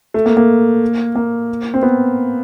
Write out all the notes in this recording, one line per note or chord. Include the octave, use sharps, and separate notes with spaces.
A3
A#3
A#3
A#3
C4
B3